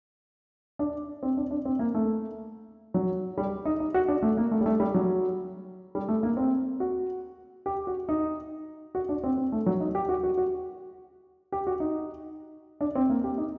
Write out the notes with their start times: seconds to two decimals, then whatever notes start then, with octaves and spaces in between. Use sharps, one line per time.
0.79 D4
1.23 C4
1.37 D4
1.51 D4
1.65 C4
1.79 A#3
1.95 A3
2.94 F#3
3.38 G3
3.65 D#4
3.80 D#4
3.94 F#4
4.08 D4
4.23 A3
4.37 A#3
4.51 A3
4.61 G3
4.66 A3
4.80 G3
4.94 F#3
5.95 G3
6.08 A3
6.23 A#3
6.37 C4
6.80 F#4
7.66 G4
7.87 F#4
8.09 D#4
8.95 F#4
9.09 D4
9.24 C4
9.38 C4
9.52 A3
9.66 F#3
9.80 D#4
9.95 G4
10.09 F#4
10.23 F#4
10.38 F#4
11.52 G4
11.67 F#4
11.80 D#4
12.81 D4
12.95 C4
13.09 A#3
13.24 G4
13.38 D#4